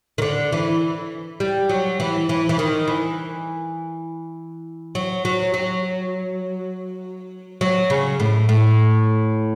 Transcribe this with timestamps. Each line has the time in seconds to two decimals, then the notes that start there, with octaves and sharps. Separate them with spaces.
0.18 D#3
0.22 D3
0.52 E3
1.40 G3
1.69 F#3
2.00 E3
2.29 E3
2.49 E3
2.59 D#3
2.88 E3
4.95 F#3
5.25 F#3
5.54 F#3
7.61 F#3
7.90 C#3
8.20 A2
8.49 A2